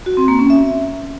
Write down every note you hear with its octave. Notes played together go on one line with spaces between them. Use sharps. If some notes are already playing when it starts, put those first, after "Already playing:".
F#4
C4
A#3
C#4
E5